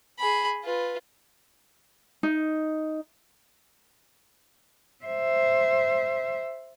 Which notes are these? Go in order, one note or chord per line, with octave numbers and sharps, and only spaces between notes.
G#4 B5
F4 B4
D#4
C5 E5